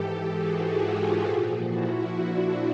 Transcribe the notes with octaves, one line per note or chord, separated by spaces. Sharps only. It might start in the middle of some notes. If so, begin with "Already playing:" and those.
Already playing: G#2 E3 G4 A4
F#4 G#4
F4 G4
A#2 F3
E4 F#4
D4 E4